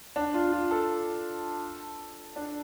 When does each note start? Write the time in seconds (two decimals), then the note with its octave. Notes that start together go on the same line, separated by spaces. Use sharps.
0.16 D4
0.34 F4
0.53 F4
0.71 A4
2.36 D4